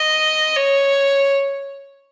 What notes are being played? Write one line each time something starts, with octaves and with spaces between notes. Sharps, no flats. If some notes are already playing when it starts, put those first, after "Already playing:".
Already playing: D#5
C#5